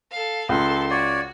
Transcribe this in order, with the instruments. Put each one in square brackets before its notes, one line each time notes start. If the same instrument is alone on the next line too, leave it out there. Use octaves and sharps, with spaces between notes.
[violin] A4 F5
[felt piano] C#2 [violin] A4 C6
[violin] F#4 [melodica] C#5 D5